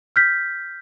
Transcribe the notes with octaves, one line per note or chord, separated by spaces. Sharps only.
F6 G6 B6